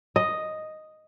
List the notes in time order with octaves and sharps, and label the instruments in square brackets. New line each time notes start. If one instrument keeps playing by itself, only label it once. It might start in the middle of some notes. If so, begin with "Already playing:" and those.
[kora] D#5